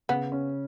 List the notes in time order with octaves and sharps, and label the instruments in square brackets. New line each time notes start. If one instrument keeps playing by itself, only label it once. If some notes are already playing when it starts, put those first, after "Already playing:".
[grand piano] C#3 [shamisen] B3
[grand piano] C#4